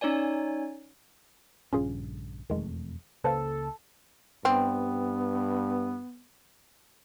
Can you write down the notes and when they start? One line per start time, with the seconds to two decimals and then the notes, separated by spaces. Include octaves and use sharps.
0.01 C#4 D#4 C#5 D5 G#5
1.73 A#1 G2 C#3 C#4 F4 G#4
2.50 E1 F2 D#3 G#3 A3
3.24 C#2 C#3 A#3 A4 B4 C5 F5
4.45 G2 G3 B3 C4